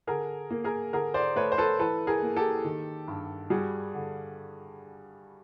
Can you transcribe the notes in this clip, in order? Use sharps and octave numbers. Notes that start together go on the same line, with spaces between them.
D3 G#4 A#4
A#3
G#4 A#4
D3 G#4 A#4
C5 D5
A3 B4 C#5
C5
A4 B4
E3 A4 B4
G#4 A#4
A#3
G4 A4
D#3
G2
G3 F#4 G#4
D3